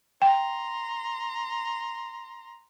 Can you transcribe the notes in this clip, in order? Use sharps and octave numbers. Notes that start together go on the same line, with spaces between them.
G5 A#5 C6